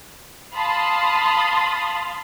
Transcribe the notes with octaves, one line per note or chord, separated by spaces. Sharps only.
F5 A5 B5 C6 D#6